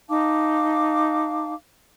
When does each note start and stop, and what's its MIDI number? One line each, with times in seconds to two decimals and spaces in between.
0.09 1.54 63
0.09 1.54 77
0.09 1.54 81
0.09 1.54 86